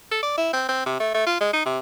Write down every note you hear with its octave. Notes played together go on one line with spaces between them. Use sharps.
A4
D5
E4
C4
C4
C3
A3
A3
F4
G#3
D#4
C3